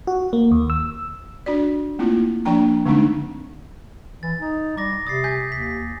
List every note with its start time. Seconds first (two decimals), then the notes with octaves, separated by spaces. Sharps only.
0.07 F#4
0.33 A#3
0.51 D#2
0.70 E6
1.46 D4 F#4 D5
1.99 A3 A#3 C4 E4 F4
2.45 F3 A#3 D4 G5 A#5
2.85 D3 G#3 A3 C4 D4 D#4
4.23 E3 A6
4.39 D#4
4.78 G3 D6 A#6
5.07 C3 D#6 A6 C7
5.24 G#5 G6 B6
5.52 D#2 B6